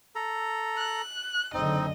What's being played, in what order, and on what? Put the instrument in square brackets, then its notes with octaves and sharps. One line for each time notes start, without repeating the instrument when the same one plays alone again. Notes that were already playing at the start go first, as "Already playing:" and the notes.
[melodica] A4 A#5
[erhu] F#6
[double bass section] F#1 D3 [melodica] C4 D#4 [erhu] D#5